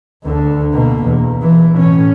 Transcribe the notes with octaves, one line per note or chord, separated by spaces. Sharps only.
D2 D3
B2 A#3
E2
B2 E3
A2 C#4